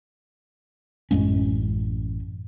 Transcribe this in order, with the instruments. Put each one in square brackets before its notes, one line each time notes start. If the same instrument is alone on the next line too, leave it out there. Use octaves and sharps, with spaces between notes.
[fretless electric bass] A1 F#2 G#3 C#4